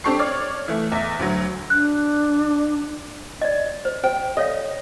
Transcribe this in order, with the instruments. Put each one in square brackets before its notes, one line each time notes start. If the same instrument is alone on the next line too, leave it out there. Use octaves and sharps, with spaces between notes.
[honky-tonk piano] C4 D4 G4 A4 C#6 C7
C#5 D5 F6
E3 A3
E2 E5
D2 F#3
[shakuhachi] D4 [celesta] F#6
[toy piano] D5 D#5
C5
[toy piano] C5 [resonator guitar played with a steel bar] G5
[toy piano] A4 C#5 F5 [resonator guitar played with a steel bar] D#5